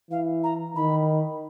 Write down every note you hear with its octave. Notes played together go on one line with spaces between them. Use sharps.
E3 F5
A#5
D#3 B5